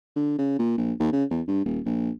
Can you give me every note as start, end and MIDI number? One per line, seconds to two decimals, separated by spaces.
0.16 0.35 50
0.38 0.57 49
0.59 0.77 46
0.78 0.93 34
0.99 1.12 39
1.12 1.24 49
1.30 1.41 40
1.47 1.63 43
1.65 1.80 27
1.85 2.10 34